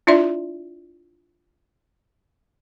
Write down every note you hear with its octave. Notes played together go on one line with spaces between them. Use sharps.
D4 E4 F4 D5 E5